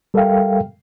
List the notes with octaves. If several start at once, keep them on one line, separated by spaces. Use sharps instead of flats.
G3 A4 A#4 E5 F5 G5